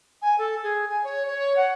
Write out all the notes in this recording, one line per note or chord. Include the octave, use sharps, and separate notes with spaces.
G#5
A4
G#4
G#5
C#5
C#5
F#5